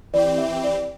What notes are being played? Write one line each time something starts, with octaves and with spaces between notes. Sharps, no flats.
E3 C4 G4 D5
E5
D5